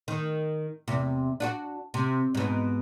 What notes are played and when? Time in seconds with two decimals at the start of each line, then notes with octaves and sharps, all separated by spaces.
0.08 D#3
0.88 E2 C3
1.40 D4 F4 F#4
1.94 C3
2.35 G#2 B2